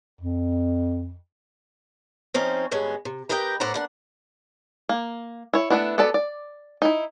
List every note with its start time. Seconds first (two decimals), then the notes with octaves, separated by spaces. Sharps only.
0.21 F2
2.34 F3 C4 C#4 D#4
2.71 D2 G2 G#3 B3 C#4
3.05 C3
3.29 G4 A#4 B4 D#5 F5 G5
3.60 A2 C5 D5 F#5 A#5
3.74 A#3 D4 F#5
4.89 A#3
5.53 E4 C#5
5.70 A3 B3 C4 D4 E4
5.98 B3 F#4 A4 D5 A5
6.14 D5
6.82 D#4 E4